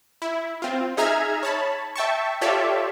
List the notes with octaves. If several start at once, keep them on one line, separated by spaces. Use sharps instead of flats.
E4
C4 F4
D#4 G#4 E5 A#5 F6 G#6
C#5 A5 B5
E5 G5 A5 C#6
F4 G4 A4 C#5 D5 E5